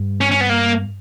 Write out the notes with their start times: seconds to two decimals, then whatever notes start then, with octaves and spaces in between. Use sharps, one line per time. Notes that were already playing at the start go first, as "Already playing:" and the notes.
Already playing: G2
0.21 C#4
0.31 C#4
0.41 B3
0.49 A#3